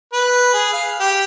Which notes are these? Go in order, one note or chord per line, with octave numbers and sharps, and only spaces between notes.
B4
G#4
F5
G4